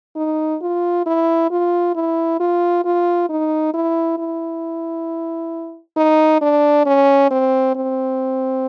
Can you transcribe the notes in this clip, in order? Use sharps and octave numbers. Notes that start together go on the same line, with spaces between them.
D#4
F4
E4
F4
E4
F4
F4
D#4
E4
E4
D#4
D4
C#4
C4
C4